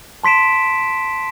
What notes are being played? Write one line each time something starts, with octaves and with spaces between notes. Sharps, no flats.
A5 C6 B6 D7 E7